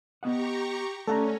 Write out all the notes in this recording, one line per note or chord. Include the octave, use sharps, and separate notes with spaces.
B3 G4 D#5 F#5 A#5 C#6
A3 C#4 A4 D5 F#5 A#5